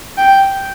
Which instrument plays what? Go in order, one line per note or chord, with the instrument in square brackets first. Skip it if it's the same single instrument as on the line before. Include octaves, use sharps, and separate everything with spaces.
[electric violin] G5